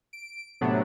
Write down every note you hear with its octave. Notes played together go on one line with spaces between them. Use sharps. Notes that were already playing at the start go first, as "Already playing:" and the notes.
D7
A2 C3 F#3 A3 B3 D4